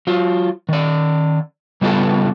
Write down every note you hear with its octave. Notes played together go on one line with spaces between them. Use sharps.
F#3 F4
D#3 D5
C#3 G3 B3 F4 G#4 A4